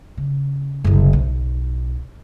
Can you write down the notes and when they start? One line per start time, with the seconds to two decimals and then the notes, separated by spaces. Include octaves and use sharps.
0.17 C#3
0.84 F#1 C2
1.13 B1